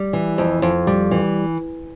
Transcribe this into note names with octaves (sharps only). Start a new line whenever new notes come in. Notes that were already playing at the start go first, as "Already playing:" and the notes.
Already playing: G3
E3
F2
F2
G3
E3